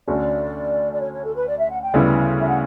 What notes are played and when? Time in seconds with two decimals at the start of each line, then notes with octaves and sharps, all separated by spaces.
0.07 D2 D3 A3 C#4 F#4 D5
0.93 D5
1.00 C#5
1.12 C#5
1.24 A4
1.35 B4
1.47 D5
1.59 E5
1.71 F#5
1.82 G5
1.94 D2 C#3 G3 B3 E4
2.40 E5
2.48 F#5